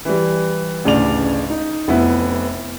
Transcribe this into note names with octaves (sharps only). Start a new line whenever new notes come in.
E3 G3
A1 D2 C#3 D4 D5 F7
D#4
F1 B3 E4